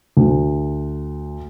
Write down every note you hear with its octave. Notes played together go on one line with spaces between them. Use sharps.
D2